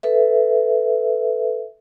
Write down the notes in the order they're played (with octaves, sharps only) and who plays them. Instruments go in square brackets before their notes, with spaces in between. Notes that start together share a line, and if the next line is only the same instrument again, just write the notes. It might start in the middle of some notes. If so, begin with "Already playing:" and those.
[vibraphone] A4 B4 E5